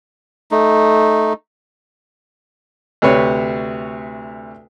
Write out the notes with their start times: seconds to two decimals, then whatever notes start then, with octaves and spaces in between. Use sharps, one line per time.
0.51 A3 D#4
3.02 D2 C3 B4 C#5